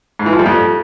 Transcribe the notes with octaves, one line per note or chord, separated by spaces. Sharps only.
G#2
E3
F3
G3
F2